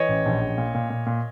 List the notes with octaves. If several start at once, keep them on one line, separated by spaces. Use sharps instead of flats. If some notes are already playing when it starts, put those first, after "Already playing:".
Already playing: E3 C#5 D#5
A1
A#1
A#1
A#2
A#2
A#2
A#2